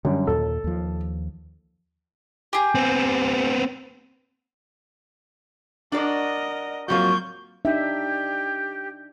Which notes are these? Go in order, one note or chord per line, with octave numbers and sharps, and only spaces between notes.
F#2 D3 G3
D#2 A#2 A4
D#2 F3
G4 G#4
B3 C4
D4 F#4 A#4 D5 D#5
G#2 F3 F#3 A#3 C4 F#4 C#6 G6
D4 D#4 G4 E5